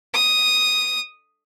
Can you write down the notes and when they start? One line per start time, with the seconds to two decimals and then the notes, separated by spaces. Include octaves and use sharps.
0.14 D#6